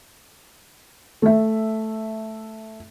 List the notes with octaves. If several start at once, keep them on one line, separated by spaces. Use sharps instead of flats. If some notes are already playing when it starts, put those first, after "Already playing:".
A3 E5